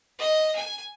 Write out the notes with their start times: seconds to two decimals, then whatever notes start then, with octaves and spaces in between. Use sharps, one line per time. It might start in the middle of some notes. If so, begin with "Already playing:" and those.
0.18 D#5
0.56 G#5